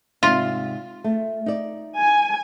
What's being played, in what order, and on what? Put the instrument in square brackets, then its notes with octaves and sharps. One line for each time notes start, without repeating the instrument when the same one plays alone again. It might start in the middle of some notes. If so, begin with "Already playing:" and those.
[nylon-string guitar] G#2 C3 D5 [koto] F4
[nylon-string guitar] A3
D#4 D5
[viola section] G#5